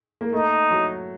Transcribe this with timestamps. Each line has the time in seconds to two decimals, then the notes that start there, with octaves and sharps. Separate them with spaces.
0.21 A#3
0.32 A3 D#4
0.71 F#3